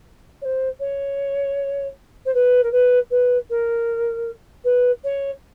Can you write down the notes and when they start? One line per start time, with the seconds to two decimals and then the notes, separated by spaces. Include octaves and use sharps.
0.41 C#5
0.44 C5
0.79 C#5
2.25 C5
2.34 B4
2.63 A#4
2.71 B4
3.10 B4
3.49 A#4
4.64 B4
5.03 C#5